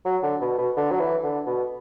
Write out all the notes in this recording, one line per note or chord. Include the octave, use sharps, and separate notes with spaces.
F#3
D3
B2
B2
D3
F#3
E3
D3
B2